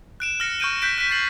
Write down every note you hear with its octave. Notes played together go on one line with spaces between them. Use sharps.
F#6 D7 E7
F6 A#6 C#7
C#6 F6 G6 D7 D#7
F#6 G6 B6 D7
F#6 B6
F#6 A6 C7 F#7